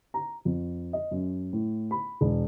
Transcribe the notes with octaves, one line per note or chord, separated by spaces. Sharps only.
A#5
F2
D#5
F#2
A2
B5
E1